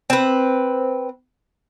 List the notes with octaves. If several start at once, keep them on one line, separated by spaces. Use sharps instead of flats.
C4 B4